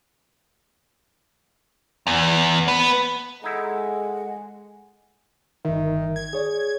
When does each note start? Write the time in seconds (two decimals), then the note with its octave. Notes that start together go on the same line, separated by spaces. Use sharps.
2.07 E2
2.68 B3
3.44 G#3 D#4 E4 A4 E5 F#5
5.65 G1 D#3 E5
6.16 G#6
6.33 G#4 C#5 D5